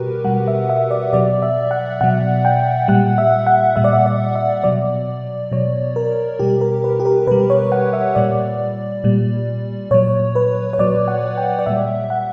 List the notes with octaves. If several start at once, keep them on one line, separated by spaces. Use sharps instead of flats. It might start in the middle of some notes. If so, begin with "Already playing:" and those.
Already playing: B2 G3 F#4 G4 A#4 B4
B2 G3 F#5
E5
E5
D5
B2 F#3 D5
E5
F#5
B2 F#3 F#5
G5
A#2 G3 F#5
E5
F#5
A#2 G3 E5
D5
E5
D5
E5
B2 F#3 D5
B2 F#3 C#5
A#4
B2 G3 G4
A#4
B4
G4
A#4
B2 G3 B4
C#5
F#5
E5
A#2 G3 D5
A#2 G3
A#2 F#3 C#5
B4
C#5
A#2 F#3 D5
F#5
G5
D5
A#2 G3 E5
F#5